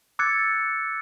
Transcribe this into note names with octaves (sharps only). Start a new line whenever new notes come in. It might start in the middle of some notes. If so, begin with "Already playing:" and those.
D6 E6 F#6 G#6 A6 C#7